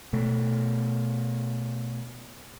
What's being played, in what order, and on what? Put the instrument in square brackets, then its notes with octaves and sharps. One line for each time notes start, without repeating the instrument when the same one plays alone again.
[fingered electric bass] B2 A3